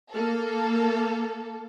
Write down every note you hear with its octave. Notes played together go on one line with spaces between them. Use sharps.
A#3 A4